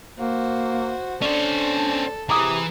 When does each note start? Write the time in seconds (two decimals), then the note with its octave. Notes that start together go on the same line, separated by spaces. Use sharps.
0.18 A#3 F#4 C5
1.22 C#4 D4 A4 C5 D5
2.29 C3 E3 G#4 A#5 D6 D#6